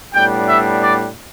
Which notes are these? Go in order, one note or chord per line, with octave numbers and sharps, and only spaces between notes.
A2 G3 B3 D4 G5
E5
D5